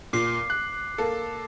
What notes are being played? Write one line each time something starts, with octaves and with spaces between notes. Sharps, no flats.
A#2 D6 C7
F#6
A#3 A4